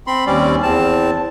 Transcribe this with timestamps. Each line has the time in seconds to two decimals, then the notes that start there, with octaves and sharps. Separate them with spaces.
0.07 C4 B5 C6
0.27 D#2 G3 C4 C#4 D5
0.63 E2 C4 A5